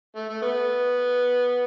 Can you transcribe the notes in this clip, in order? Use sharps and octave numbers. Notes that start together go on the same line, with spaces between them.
A3
A3
B3